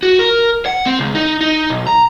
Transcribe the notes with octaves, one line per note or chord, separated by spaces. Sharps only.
F#4
A#4
F#5
C4
C#2
D#4
D#4
B1
A#5